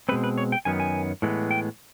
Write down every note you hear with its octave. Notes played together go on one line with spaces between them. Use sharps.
B2 G#3 C4 B4
B4
C#5
G5
F#2 D#3 F#3 B3 G#5
G#5
A2 E3 G#3 B3
G5